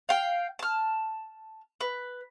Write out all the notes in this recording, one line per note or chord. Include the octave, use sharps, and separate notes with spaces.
F5 G5
A5 F6
B4